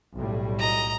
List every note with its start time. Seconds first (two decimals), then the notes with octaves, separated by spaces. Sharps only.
0.15 B1 A2 G3
0.58 D#5 A#5